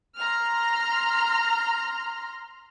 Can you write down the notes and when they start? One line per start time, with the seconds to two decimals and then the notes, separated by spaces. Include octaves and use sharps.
0.18 A#5 C6 F6